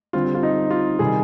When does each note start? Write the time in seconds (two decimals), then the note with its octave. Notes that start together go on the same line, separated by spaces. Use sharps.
0.13 D3 G3 C4 F4
0.35 F4
0.43 D#4
0.71 F4
0.99 C3 D#3 G3 G#4